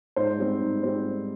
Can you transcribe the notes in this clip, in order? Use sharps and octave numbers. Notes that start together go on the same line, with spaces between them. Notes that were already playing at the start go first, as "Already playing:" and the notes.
G#2 C5
G3 C4
G#2
G3 C4